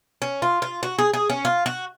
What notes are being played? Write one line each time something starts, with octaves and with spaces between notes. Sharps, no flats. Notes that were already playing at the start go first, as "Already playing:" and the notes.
C#4
F4
F4
F#4
G#4
G#4
C#4
F4
F#4